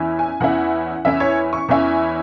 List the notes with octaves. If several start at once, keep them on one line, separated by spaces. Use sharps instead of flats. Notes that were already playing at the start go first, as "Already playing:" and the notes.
Already playing: E2 E3 C#4 E4
G#5
E2 E3 C#4 E4 F#5
E2 E3 C#4 E4 E5
C#5
C#6
E2 E3 C#4 E4